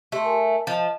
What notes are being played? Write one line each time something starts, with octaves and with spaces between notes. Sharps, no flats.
A3 G4 A5 C6
A#4 E5 G#5
F3 D#5 A5